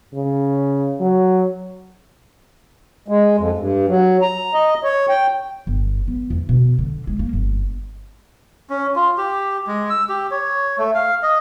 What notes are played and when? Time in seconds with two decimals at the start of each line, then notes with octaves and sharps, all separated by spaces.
0.14 C#3
1.00 F#3
3.08 G#3
3.38 F2
3.58 G2
3.88 F#3
4.22 A#5
4.54 D#5
4.84 C#5
5.09 G5
5.67 G1
6.08 B3
6.30 E2
6.49 B2
6.79 D3
7.07 G#3
7.19 A#3
7.33 G1
8.70 C#4
8.96 F4
9.18 G4
9.67 G#3
9.90 E6
10.09 G4
10.31 C#5
10.78 A3
10.95 F5
11.23 D#5